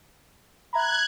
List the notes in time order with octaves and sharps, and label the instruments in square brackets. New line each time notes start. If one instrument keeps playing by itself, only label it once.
[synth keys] E5 A#5 B5 [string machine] F#6 G#6